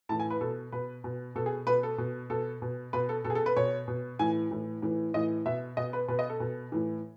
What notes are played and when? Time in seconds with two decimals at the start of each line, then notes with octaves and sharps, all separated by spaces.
0.09 A2 E3 A5
0.20 G#5
0.30 B4
0.41 B2 A4
0.72 B2 B4
1.04 B2
1.35 B2 A4
1.46 G#4
1.67 B2 B4
1.83 A4
1.98 B2
2.30 B2 A4
2.62 B2
2.93 B2 B4
3.09 A4
3.25 B2 A4
3.30 G#4
3.35 A4
3.46 B4
3.56 B2 C#5
3.88 B2
4.19 A2 E3 G#5
4.51 A2 E3
4.82 A2 E3
5.14 A2 E3 D#5
5.46 B2 E5
5.77 B2 D#5
5.93 B4
6.08 B2 B4
6.19 D#5
6.30 A4
6.40 B2
6.72 A2 E3